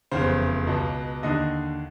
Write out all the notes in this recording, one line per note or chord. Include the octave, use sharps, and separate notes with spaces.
F1 E2 C#3 C5
C#2 B2
D#2 D3 D#5